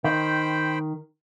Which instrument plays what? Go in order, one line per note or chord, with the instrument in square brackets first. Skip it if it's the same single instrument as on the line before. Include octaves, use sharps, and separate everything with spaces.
[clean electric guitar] D#3 [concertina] C5 G5 B5